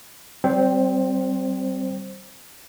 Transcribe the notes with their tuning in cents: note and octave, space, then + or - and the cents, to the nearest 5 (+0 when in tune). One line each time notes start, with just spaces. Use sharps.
G3 -30 C4 +0 C5 +15